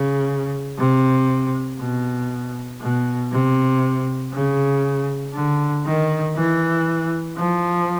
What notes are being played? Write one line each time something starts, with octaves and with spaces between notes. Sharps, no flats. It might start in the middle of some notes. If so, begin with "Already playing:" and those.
Already playing: C#3
C3
B2
B2
C3
C#3
D3
D#3
E3
F3